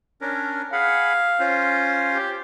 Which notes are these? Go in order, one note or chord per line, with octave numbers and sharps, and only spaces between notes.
C#4 D4 A#4
G#4 F5 F#5 B5
C#4 F4 C5
G4